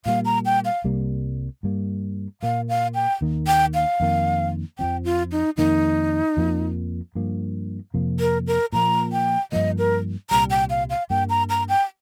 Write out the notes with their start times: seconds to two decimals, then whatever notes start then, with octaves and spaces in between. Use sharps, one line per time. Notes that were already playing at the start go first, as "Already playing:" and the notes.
0.06 A#2 G3 A#3 F5
0.25 A#5
0.46 G5
0.65 F5
0.84 C2 C3 G3 A#3
1.63 G2 G3 A#3
2.43 A#2 A#3 F5
2.69 F5
2.95 G5
3.21 D#2 D#3 A#3
3.47 G5
3.74 F5
4.00 F2 D#3 A#3
4.78 F2 F3 C4 G5
5.05 F4
5.32 D#4
5.57 F2 D#3 A#3 D#4
6.37 F2 F3 A#3
7.15 G2 F3 A#3
7.94 F2 C3 F3 A#3
8.20 A#4
8.47 A#4
8.73 A#2 F3 A#3 A#5
9.12 G5
9.52 G2 F3 A#3 D#5
9.78 A#4
10.30 C2 A#2 G3 A#5
10.50 G5
10.70 F5
10.90 F5
11.10 G2 G3 A#3 G5
11.30 A#5
11.50 A#5
11.69 G5